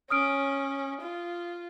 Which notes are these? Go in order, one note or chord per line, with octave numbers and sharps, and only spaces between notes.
C#4 D#6 F6 D7
F4